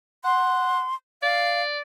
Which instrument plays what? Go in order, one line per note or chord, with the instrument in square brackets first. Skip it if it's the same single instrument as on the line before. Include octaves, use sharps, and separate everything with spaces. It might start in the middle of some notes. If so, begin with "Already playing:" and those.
[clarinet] F#5 [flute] C6
[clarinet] D5 [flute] F5